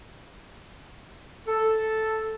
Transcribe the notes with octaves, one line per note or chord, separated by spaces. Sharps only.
A4